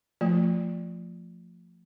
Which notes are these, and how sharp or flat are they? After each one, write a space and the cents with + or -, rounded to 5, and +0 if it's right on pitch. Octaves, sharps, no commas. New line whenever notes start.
F3 +0 A3 +30 F4 +0